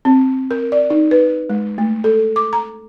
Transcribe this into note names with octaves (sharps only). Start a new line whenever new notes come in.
C4
A#4
D5
D#4
B4
G#3
A3
A4
D6
A#5